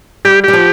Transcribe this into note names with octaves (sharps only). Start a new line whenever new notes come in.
G3 G4
G3 G4
F3